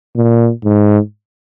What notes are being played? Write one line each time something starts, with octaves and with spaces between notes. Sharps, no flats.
A#2
G#2